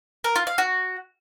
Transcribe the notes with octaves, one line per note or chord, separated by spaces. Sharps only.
A#4
F4
F5
F#4